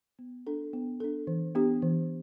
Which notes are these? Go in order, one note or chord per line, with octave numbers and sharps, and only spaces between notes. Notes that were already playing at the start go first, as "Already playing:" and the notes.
B3
D4 A4
B3
D4 A4
E3
B3 D4 G4
E3